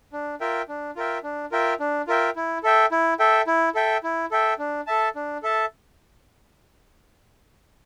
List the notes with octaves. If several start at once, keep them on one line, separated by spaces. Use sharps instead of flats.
D4
F4 A#4 E5 G5
D4
F4 A#4 E5 G5
D4
F4 A#4 E5 G5
D4
F4 A#4 E5 G5
E4
A4 E5 G5
E4
A4 E5 G5
E4
A4 E5 G5
E4
A4 E5 G5
D4
A4 E5 A5
D4
A4 E5 A5